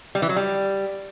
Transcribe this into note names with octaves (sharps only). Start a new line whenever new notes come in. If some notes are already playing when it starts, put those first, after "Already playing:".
G3
E3
F#3
G3